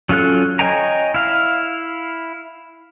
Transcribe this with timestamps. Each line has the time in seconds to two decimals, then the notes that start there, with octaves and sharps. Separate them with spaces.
0.09 F#3 C#4 F4 A4 F#6
0.59 C#5 D#5 G5 G#5 A#5
1.14 E4 F5